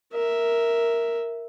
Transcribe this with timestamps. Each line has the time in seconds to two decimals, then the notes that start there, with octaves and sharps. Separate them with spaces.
0.13 A#4 E5